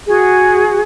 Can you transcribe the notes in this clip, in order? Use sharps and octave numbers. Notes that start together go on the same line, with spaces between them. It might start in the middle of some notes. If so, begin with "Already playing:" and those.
F#4 G#4